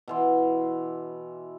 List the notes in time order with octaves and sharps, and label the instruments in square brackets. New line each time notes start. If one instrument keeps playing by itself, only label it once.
[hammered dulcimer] B2 E3 C6